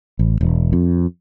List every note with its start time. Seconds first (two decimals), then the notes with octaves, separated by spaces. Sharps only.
0.19 A1
0.41 E1
0.73 F2